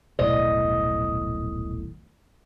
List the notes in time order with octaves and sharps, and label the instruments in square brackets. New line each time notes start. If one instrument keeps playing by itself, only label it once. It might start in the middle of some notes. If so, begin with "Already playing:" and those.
[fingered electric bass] D#1 B1 A2 [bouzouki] D#5